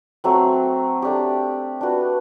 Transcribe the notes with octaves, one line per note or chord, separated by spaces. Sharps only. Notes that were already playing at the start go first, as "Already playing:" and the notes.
F#3 A3 C4
A3 D4 G4
D4 F#4 B4